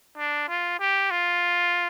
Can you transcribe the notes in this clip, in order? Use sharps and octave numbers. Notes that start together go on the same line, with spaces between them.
D4
F4
G4
F4